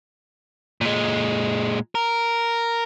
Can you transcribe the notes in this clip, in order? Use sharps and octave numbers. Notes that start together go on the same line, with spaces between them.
A#2 G#3
A#4